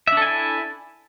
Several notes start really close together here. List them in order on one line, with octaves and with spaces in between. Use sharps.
E5 D4 A4 G#5 E4